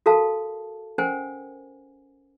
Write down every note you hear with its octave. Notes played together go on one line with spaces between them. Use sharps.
F#4 A4 A#4 F5 A5
C#4 A#4 C5 F#5 G#5